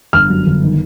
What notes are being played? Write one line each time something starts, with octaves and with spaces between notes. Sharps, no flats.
G1 F6
F#2
G1
D#3